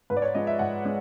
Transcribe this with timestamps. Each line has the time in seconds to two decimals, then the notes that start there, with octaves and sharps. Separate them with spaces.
0.10 G#2 B4
0.17 D5
0.22 C#5
0.35 F3 G#3 D#5
0.47 E5
0.59 G#2 F#5
0.85 G#3